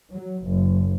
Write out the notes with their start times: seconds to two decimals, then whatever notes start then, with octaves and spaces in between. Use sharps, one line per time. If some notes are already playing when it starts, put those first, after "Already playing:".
0.11 F#3
0.44 F#1